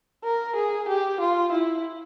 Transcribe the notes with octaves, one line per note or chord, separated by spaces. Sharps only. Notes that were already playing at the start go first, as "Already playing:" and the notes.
A#4
G#4
G4
F4
E4